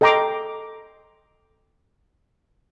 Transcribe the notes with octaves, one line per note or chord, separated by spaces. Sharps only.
A4 D#5 G5 A#5 C6 D6